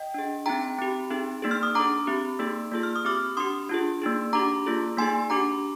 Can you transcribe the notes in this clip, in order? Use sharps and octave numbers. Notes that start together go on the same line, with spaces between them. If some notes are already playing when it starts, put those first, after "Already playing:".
Already playing: D#5 G5
D4 G#4
C4 D#4 G#4 G5 A#5
C4 G4
C4 D#4 G#4
A#3 D#4 G#4
F6
D#6
D4 G#4 A#5 D6
C4 G4
A#3 D#4 G#4
A#3 F4 G#4
F6
D#6
C4 G4 D6 F6
D4 G4 C6 D#6
D4 F4 G#4
A#3 D#4 G#4
D4 G4 A#5 D6
A#3 F4 G#4
A#3 D#4 G#4 G#5 C6
D4 G4 A#5 D6